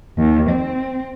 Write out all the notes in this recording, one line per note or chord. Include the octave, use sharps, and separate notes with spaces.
D#2
C4